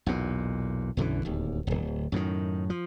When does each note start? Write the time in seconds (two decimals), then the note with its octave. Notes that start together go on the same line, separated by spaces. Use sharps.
0.06 B1 E2 A#2
0.97 B1 F#2 D3 E3
1.25 D1 D#2
1.67 D1 G1
2.12 F#2 A2 C3 D#3
2.70 F3